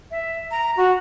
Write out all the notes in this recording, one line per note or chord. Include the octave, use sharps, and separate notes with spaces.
E5
A#5
F#4